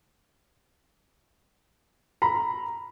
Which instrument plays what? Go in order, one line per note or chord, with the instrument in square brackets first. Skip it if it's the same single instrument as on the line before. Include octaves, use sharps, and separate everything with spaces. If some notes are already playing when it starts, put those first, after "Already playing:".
[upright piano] A#5 B5